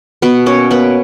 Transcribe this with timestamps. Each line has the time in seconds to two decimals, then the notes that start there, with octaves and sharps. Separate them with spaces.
0.22 B2 B3 B4
0.46 A#3 C#4 C#5
0.71 A#3 B3 B4